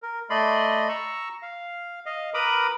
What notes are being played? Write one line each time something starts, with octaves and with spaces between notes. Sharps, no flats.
A#4
A3 D5 D#5 B5 C6
A#5 C#6 E6
F5
D#5 F5
A#4 B4 A#5 B5 D6 D#6